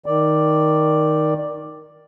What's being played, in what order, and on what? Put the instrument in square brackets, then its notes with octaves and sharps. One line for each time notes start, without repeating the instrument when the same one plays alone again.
[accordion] D#3 D5